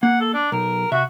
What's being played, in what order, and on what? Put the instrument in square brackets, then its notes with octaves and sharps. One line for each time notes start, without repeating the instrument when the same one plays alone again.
[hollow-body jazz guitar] A#3 [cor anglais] F#5
[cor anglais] A4
D4
[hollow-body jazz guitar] B1 [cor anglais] A#4
[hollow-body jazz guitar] C3 E5 [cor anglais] F#4